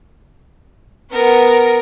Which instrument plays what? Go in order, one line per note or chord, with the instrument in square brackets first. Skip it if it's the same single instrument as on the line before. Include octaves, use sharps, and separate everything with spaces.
[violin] B3 F#5 [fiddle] A#4